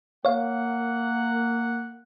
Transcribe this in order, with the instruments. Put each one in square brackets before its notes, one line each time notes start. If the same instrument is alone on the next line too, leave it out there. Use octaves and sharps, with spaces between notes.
[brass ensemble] A#3 F#5 [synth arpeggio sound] C#5 F5